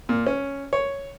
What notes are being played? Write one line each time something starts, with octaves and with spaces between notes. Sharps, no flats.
A#2
C#4
C#5